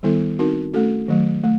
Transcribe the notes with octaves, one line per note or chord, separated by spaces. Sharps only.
D#3 G3 B3 E4 A4
C4 D#4 F#4 A#4
A3 C#4 F#4 A4
D#3 F#3 A3
A3